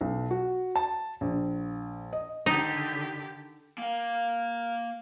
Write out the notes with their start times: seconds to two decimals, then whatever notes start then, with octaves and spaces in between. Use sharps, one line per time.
0.01 B1
0.31 F#4
0.76 A5
1.21 A#1
2.13 D#5
2.46 D3 D#3 D#4 G4
3.78 A#3 F5